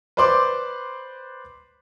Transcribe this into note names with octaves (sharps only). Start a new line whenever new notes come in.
B4 C5 D5 C6 D6